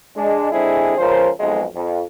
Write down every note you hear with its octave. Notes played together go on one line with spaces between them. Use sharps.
G#3 D4
D3 G#3 C4 D4 E4 G#4
C#2 F3 C#4 A#4 C5
B1 F2 G#3
F2